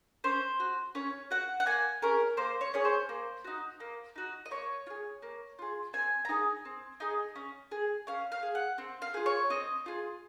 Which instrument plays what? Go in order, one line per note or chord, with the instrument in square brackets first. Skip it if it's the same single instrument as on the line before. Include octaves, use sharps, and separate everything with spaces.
[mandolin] C#4 C5
F#4
C#4 C#5
F#4 F#5
F#5
A#3 G#5
C#4 G#4 A#4
A#3 C5
C#5
C#4 G#4 C#5
C5
A#3
D#4 F#4
A#3
D#4 F#4
D#5
A#3 C#5
F4
G#4
A#3
F4 G#4
C4 G#5
A#5
D#4 G#4 G#5
C4
D#4 G#4
C#4
G#4
C#4 F5
F5
G#4
F#5
C4
F5
F4 G#4
C#5
C4 D#5
F4 G#4